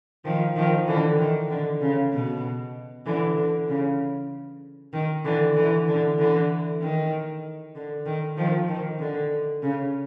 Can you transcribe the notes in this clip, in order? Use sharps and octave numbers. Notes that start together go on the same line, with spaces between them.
D#3 F3
D#3 F3
D3 E3
D#3
D3
C#3
B2
D3 E3
D3
C#3
D#3
D3 E3
D3 E3
D3
D3 E3
D#3
D3
D#3
D#3 F3
D#3
D3
C#3